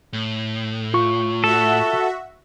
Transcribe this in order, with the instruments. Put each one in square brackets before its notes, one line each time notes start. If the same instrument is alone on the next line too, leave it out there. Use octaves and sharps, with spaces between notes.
[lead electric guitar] A2
[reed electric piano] F4 C#6
[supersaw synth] F#4 E5 [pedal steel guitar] A4